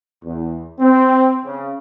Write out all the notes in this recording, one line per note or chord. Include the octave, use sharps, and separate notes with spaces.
E2
C4
C#3